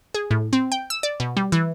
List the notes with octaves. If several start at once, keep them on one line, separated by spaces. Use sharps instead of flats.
G#4
A2
C4
G5
E6
D5
B2
G3
E3